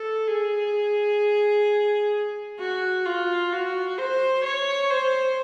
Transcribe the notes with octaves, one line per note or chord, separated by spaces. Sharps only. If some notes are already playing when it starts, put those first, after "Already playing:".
Already playing: A4
G#4
F#4
F4
F#4
C5
C#5
C5